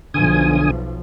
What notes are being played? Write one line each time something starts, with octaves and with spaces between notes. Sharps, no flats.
B1 D3 F3 G#5 D#6